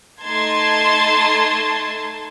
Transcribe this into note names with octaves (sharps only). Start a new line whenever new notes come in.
A3 D#4 A5 C6 G#6